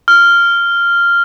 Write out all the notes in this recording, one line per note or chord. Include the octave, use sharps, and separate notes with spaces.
F6